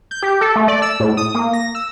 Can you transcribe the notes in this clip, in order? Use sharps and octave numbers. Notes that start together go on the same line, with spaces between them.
G6
G4
A4
A3
D5
E6
A2
D#6
A#3
A#6
E6